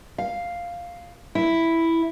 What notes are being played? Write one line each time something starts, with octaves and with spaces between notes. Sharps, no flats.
F5
E4